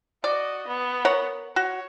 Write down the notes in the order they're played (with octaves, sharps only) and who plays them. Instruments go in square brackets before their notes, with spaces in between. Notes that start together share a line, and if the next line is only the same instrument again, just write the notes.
[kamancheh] F#4 D#5 [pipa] D5
[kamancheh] B3
[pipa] A#4 C#5 F#5
[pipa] F#4 [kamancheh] C#5